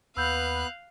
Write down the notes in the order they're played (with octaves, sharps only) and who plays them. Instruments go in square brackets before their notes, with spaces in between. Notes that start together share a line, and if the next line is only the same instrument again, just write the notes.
[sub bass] D#2 [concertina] B3 B4 [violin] F5 F#6 [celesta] E6 G6